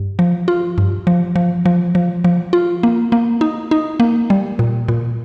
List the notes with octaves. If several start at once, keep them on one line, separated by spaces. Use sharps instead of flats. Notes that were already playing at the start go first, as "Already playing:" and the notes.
Already playing: G2
F3
F4
G2
F3
F3
F3
F3
F3
F4
A#3
A#3
D#4
D#4
A#3
G3
A#2
A#2